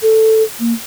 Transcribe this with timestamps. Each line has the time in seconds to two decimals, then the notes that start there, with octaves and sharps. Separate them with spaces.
0.02 A4
0.59 A#3